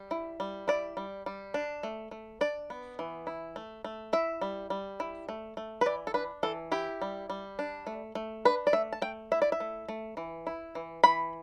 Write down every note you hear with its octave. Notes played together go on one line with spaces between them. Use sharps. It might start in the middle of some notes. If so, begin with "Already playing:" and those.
Already playing: G3
E4
G3
E4 D5
G3
G3
D4
A3
A3
D4 D5
B3
E3
E4
A3
A3
E4 E5
G3
G3
E4
A3
A3
B4
E3 D5
A4
D4 B4
E3 A4
E4 G4
G3
G3
D4
A3
A3
D4 B4
D5
A3 E5
A5
A3 G5
E4 E5
D5
E5
A3
A3
E3
E4
E3
E3 B5